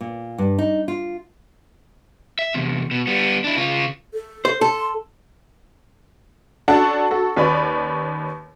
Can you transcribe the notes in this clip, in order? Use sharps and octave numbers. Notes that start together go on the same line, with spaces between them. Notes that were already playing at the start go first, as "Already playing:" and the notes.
A#2
G2
D#4
F4
E5
E2 C3
B2
G3 B3
D4 E4
C#3 F4
A4
C5
A4 C6
C#4 D4 F#4 A4 F#5 A5
F#4 A4
D#2 C#4 B4 D5 B5